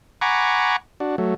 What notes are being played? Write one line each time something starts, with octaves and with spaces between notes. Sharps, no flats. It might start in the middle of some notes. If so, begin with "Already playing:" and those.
F#5 G#5 A#5 B5 C#6 D6
D4 F#4
F#3 A3